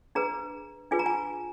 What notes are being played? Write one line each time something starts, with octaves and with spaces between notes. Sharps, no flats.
D4 G#4 B4 A#5
D4 F4 G#4 B4 G#5
A#5
G#5